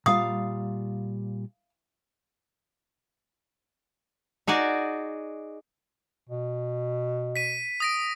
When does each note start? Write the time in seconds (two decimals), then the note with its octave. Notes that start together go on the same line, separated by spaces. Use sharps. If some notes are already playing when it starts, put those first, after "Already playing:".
0.06 A#2 G3 F4 F5 D#6
4.47 D#4 F#4 G#4 D5
6.30 B2
7.36 B6 D#7
7.80 D#6 A#6 D7